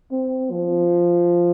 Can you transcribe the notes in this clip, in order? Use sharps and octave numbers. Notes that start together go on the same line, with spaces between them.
C4
F3